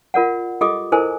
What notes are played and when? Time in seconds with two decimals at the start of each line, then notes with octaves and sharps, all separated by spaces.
0.14 F4 A#4 D5 F#5
0.61 F4 G4 A4 D#5 D6 D#6
0.92 E4 A4 A#4 C5 D#5 G#5